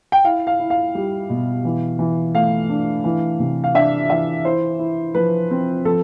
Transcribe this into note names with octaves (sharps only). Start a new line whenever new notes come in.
G5
E4 F5
F5
E4
F5
G3
B2
E3
E3
A3 F5
D4
E3
C3
F5
D4 E5
E3 E5
E4 C5
E4
F3 B4
C4
F3 A4